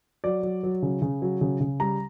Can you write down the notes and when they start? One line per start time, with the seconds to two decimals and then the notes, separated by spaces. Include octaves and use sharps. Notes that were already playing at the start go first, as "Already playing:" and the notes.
0.24 F#3 D5
0.43 F#3
0.63 F#3
0.82 C#3
1.02 C#3
1.22 F#3
1.41 C#3
1.60 C#3
1.80 G3 A#5